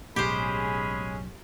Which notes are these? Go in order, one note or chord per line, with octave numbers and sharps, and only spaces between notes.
B1 A2 G#3 C#4 G4 G#4 C5 B5